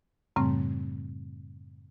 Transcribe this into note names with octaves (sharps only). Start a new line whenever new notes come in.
F#2 A2 C#3 G3 A3 C4